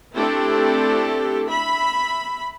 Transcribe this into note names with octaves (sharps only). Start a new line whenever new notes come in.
A3 C4 D4 E4 G4 A4
E5 B5